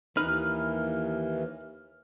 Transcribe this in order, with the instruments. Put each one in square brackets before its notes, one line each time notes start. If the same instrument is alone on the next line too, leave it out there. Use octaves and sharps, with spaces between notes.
[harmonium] D#2 E3 [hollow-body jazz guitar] D#4 B4 [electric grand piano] F6